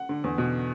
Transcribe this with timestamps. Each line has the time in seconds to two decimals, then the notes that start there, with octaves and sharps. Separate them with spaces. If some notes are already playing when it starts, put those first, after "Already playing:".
Already playing: F#5
0.09 D3
0.24 E2
0.38 B2